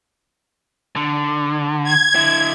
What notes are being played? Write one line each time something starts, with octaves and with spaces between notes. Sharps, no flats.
D3
G#6
D3 E4